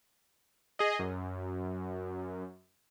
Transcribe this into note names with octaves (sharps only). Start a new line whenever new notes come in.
G#4 D#5
F#2